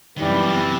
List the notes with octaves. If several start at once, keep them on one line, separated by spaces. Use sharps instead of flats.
F#2 D#3 E3 G3
C3
B2
C3